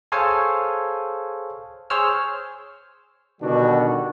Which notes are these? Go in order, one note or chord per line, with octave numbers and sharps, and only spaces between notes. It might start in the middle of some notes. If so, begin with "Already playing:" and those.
G#4 A4 C5 C#5 F5 G#5
G#4 C5 C#5 E6 F6
B2 D3 D#3 G3 D4 F#4